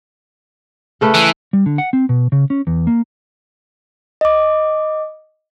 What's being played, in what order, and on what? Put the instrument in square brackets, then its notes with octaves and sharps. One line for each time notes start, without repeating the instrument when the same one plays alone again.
[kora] C#3 A3 B4
[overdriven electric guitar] E3
[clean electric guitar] G3
D3
F#5
C4
B2
C#3
C#4
E2
A#3
[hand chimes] D#5 D6